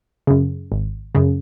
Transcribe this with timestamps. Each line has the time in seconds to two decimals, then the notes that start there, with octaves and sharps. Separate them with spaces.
0.27 F#2 C#3
0.72 G#1
1.15 F#2 C#3